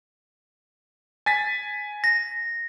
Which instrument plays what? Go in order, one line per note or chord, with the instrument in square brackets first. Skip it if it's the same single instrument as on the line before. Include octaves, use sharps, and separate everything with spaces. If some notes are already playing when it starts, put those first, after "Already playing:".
[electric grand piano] G#5 A6 B6
[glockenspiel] A#6